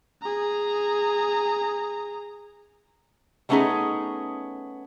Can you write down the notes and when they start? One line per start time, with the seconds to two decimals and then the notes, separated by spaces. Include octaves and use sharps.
0.22 G#4 A#5
3.49 G3 A3 B3 C#4 D#4 G#4